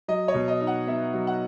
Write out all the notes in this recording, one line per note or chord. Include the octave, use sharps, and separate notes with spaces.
F#3 D#5
C#5
B2
D#5
D#4
F#5
B3 E5
F#3
F#5